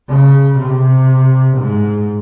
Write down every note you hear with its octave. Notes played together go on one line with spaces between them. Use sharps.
C#3
C3
G#2